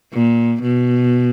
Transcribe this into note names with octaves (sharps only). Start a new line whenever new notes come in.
A#2
B2